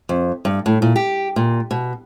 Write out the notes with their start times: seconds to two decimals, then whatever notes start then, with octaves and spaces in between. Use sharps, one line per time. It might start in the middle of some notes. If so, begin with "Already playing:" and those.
0.09 F2
0.45 G2
0.66 A2
0.82 A#2
0.96 G4
1.36 A#2
1.71 B2